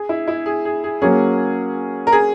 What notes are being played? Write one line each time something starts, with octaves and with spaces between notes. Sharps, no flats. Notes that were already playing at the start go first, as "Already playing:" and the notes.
Already playing: G#4
E4
E4
G#4
G#4
G#4
F#3 A#3 C#4 G#4
A#4
G#4